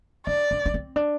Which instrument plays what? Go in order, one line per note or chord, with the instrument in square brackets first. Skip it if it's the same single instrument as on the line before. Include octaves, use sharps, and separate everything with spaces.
[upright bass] D4 [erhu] D5
[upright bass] D4
D4
C4
D4